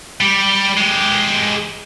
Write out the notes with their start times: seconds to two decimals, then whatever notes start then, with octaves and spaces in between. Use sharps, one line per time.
0.20 G3 G4
0.77 G#3 G4